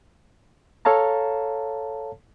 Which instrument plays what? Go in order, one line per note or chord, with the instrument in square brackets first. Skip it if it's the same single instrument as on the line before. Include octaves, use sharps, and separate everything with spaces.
[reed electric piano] A4 C#5 F5 A5 A#5